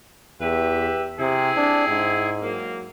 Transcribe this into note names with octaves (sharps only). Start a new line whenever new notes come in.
E2 G4 B4 E5
C3 C4 E4 G#4
D4
G#2
F#3 A#3